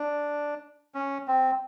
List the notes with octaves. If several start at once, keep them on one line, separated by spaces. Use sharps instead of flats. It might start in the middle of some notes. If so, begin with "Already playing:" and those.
Already playing: D4
C#4
C4